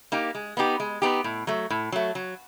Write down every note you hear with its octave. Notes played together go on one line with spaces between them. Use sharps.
A#3 D#4 G4
G#3
B3 D#4 G4
G#3
B3 D#4 G4
A2
F#3 A3
A2
F#3 A3
F#3